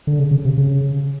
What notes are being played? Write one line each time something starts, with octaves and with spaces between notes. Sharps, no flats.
D3
C#3
C#3
C3
C#3